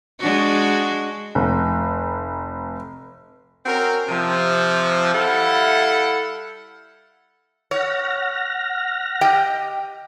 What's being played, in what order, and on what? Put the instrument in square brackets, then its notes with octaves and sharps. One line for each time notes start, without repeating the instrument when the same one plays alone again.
[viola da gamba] G#3 D4 F#4
[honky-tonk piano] F1
[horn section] C4 C#4 F#4 A#4
C3 F3
G3 E4 A4 F5 F#5
[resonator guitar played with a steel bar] C#5 [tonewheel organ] F#5 F6 A#6
[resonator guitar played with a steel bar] G4 D#5 G5